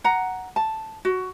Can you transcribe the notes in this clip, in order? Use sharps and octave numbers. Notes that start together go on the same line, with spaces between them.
F#5 A#5
A5
F#4